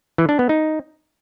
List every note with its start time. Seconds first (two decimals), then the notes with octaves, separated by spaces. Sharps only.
0.18 E3
0.29 D4
0.39 B3
0.49 D#4